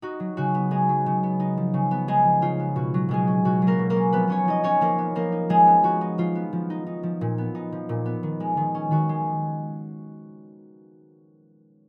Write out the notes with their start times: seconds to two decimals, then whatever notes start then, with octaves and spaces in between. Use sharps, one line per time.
0.02 D#4 F#4
0.20 F#3
0.37 C#3 F#4
0.54 B3
0.71 G#3 D#4 G#4
0.89 F#3
1.06 C#3
1.23 B3
1.40 D#4
1.57 F3
1.74 C#3
1.91 B3
2.08 G#3 D#4 G#4
2.25 F3
2.42 C#3 F4
2.59 B3
2.76 B2 F#4
2.94 F#3
3.09 B2 G#3 G#4
3.27 C#4
3.45 B2 F#4
3.62 F#3
3.67 A#3 A#4
3.79 B2
3.90 A#3 A#4
3.96 C#4
4.13 F3 B3 B4
4.28 B3 C#4 C#5
4.45 F3 D#4 D#5
4.64 C#4 D#4 C#5
4.81 F3 A#3 A#4
4.98 B3
5.15 F3 A#3 A#4
5.32 D#4
5.49 F3 G#3 G#4
5.67 B3
5.83 F3 F#4
6.01 D#4
6.18 F3 F4
6.35 B3
6.53 F3
6.70 D#4
6.87 D#4
7.03 F3
7.21 A#2
7.38 B3
7.55 D#4
7.72 F3
7.89 A#2
8.06 B3
8.23 D#3
8.40 G#3
8.57 D#3
8.75 C#4
8.91 D#3 F#4
9.09 G#3